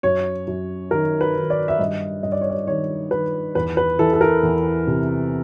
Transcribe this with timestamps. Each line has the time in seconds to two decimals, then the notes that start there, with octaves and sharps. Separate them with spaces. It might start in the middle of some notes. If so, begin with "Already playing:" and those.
0.03 F#2 C#5
0.47 F#2
0.91 D#3 A#4
1.21 B4
1.35 D#3
1.50 D5
1.68 E5
1.79 G2 D#5
2.23 G2 D#5
2.32 D5
2.41 C#5
2.50 D5
2.67 D#3 C#5
3.11 D#3 B4
3.55 E2 B4
3.77 B4
3.99 E3 A4
4.13 A4
4.21 A#4
4.43 E2
4.87 C3